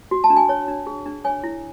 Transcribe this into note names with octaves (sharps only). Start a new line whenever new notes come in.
F#4
A5
D4
G#5
C#5
D4
G#4
D4
C#5 G#5
E4